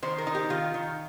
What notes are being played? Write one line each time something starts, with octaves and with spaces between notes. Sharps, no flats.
D#3 C5
A#4
D#4
G4
D#3 F4
D#3